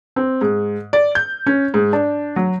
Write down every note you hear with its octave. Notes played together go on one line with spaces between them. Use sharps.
C4
G#2
D5
G6
C#4
G#2
D4
F#3